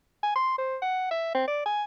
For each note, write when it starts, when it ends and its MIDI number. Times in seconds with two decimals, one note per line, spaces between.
0.23 0.34 80
0.35 0.56 84
0.58 0.77 72
0.82 1.08 78
1.11 1.31 76
1.35 1.47 60
1.48 1.65 74
1.66 1.84 80